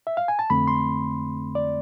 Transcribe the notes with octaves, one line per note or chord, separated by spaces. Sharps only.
E5
F5
G#5
A5
F2 D3 A3 C4 B5
C6
D5